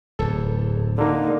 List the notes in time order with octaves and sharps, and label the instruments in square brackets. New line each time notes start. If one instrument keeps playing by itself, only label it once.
[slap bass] D1 E2 [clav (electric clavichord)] A4
[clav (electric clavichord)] D3 A#3 [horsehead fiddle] D#4